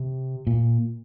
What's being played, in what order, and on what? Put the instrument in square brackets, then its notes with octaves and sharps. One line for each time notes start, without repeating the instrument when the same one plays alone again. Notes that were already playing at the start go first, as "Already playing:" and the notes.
Already playing: [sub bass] C3
[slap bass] A#2